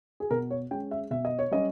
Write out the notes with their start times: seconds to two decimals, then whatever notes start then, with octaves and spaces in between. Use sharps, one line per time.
0.20 G#4
0.31 B2 A#4
0.51 C#5
0.71 G#3 C#4 G5
0.91 E5
1.10 B2 E5
1.25 D#5
1.39 C#5
1.51 G3 C#4 D#5